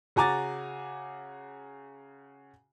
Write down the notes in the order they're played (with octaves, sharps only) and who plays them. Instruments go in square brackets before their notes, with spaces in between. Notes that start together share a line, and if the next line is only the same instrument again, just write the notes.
[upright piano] C#3 F#4 G#5 A#5 D6 A6